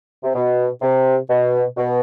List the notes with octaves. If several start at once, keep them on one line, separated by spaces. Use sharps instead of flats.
C3
B2
C3
B2
B2